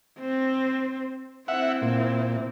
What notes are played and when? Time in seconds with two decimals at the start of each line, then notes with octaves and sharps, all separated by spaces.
0.19 C4
1.48 C4 E4 E5 F#5
1.82 A#2